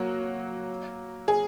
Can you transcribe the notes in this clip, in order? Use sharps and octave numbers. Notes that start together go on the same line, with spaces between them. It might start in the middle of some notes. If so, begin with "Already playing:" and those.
Already playing: F#3 A#3 F#4
G#4